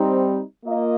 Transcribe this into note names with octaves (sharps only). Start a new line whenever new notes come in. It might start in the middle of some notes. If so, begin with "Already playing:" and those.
Already playing: G3 C4 D#4
A#3 F4 D#5